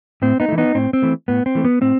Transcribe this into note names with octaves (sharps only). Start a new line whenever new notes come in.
A2 C4
B3 D#4
E3 A3
B3 D#4
A2 C4
C4
E3 A3
A2 B3
C4
E3 A3
B3
A2 C4